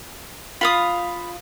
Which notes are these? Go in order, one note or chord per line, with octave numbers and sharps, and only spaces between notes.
F4 F5 B5 D#6